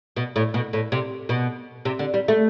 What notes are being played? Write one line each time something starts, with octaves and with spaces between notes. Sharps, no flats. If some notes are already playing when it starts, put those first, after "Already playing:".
B2
A2
B2
A2
C3
B2
C3
D3
G3
A3